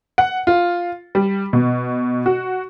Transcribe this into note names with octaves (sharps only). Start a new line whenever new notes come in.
F#5
F4
G3
B2
F#4